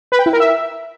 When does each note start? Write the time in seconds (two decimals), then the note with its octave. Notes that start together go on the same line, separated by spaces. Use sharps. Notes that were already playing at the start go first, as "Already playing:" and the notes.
0.12 B4
0.19 G5
0.26 E4
0.33 A#4
0.40 E5